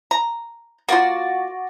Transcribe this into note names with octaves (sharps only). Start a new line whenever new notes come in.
A#5
A#3 F4 F#4 D5